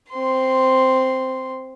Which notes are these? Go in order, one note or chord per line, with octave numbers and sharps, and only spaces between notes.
C4 C6